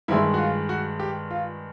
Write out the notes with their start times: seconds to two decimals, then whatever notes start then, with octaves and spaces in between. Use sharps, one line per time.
0.08 G2 D#3 G#3 E4
0.34 F#4
0.38 F4
0.69 F#4
1.00 G4
1.31 F4